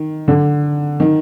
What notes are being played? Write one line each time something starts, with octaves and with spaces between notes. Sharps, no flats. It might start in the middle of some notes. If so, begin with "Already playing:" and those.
Already playing: D#3
D3
D#3